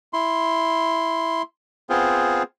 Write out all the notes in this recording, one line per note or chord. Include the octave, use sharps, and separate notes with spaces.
E4 C6
B3 C4 F4 G#4 C5